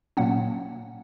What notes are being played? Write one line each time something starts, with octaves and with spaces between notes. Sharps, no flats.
A#2 F#3 A#3 C#4 F#5